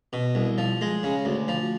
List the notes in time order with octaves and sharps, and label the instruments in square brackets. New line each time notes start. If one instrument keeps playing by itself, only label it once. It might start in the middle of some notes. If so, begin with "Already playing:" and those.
[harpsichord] B2
C2
F3
G#3
C#3
D2
F3